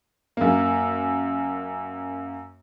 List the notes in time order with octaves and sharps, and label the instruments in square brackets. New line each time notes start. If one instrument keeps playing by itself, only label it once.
[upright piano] F#2 A#3